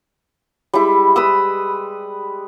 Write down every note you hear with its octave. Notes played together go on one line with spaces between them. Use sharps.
G3 G#3 E4
B4 D#6 E6